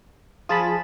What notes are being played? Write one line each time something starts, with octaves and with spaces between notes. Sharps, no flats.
F3 F4 G#4 A5 B5 D#6